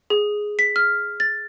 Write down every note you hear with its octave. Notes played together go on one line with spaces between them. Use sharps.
G#4
B6
F6
A6